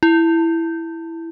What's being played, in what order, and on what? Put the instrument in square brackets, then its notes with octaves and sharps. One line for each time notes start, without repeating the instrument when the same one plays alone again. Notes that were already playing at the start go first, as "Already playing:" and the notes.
[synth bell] E4